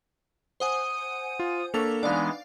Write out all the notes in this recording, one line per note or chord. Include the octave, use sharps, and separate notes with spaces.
C5 F#5 G#5 D#6
F4
A#3 D4 A4 C#6 B6 F7
E3 G#3 B3 D4 D#4 D5 F5